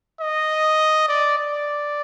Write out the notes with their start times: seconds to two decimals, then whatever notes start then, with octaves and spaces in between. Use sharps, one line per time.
0.20 D#5
1.08 D5
1.38 D5